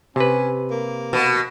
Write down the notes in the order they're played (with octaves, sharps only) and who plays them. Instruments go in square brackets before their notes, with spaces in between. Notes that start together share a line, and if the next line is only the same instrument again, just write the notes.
[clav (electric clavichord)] C3 B4 [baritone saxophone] C#4
[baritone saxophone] A#3
[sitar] B2